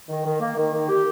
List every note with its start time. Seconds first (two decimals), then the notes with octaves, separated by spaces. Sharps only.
0.09 D#3
0.25 D#3
0.40 A#3
0.56 D#3
0.72 D#3
0.88 G4